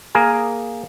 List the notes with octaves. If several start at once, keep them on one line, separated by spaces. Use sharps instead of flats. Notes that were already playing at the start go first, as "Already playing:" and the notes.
A#3 G#4 A#4 G#5